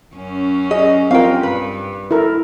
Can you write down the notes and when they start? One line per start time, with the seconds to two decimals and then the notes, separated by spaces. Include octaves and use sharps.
0.15 F#2 C#4
0.71 G#4 D#5
1.11 C4 F4 A#4 F5 G5
1.43 G2 B4
2.11 E4 A4 A#4